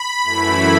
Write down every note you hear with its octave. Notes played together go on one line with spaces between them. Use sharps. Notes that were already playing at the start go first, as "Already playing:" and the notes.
Already playing: B5
F#2 E3 A3 E4